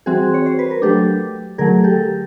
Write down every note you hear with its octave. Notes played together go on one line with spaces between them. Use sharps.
E3 G3 C4 F#4 G#4
C#5
C5
B4
A#4
F#3 A3 D4 G4 A4
D3 F#3 A3 G#4 A#4
G4 A4